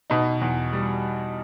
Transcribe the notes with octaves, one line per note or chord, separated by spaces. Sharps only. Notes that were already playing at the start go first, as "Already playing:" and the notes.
B2 D#4
E2
G3